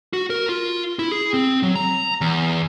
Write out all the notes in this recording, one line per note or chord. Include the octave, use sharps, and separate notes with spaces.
F#4
A#4
F4
E4
G#4
C4
F#3
A#5
E2